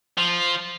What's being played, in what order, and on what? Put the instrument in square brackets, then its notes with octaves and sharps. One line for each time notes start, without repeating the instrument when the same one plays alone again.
[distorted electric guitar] F3